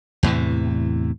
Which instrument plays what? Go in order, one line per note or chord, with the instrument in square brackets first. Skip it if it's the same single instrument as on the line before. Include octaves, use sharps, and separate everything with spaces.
[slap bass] E2 A2 C3 E3